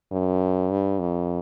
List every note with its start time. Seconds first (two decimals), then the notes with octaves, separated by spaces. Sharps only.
0.11 F#2
0.70 G2
0.99 F2